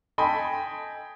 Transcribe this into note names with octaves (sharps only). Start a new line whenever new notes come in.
A4 D#5 G5 G#5 B5